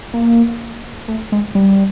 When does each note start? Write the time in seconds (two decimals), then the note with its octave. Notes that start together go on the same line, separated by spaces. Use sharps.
0.14 A#3
1.08 A3
1.32 G#3
1.55 G3